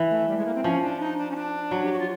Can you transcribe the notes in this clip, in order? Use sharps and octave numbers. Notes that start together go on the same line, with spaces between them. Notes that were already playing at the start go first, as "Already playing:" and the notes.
Already playing: E3
A3
G3
G#3
A#3
C4
F3 C#4
D4
D#4
D4
C#4
D4
F#3
G4
F#4
F4